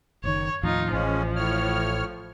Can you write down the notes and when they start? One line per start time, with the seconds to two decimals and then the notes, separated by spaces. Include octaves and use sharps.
0.24 F#1 A#2 D#3 C#5
0.63 D#2 A2 F3 D#4 F4
0.92 A1 F3 G#3 C#4
1.36 A2 C#5 F6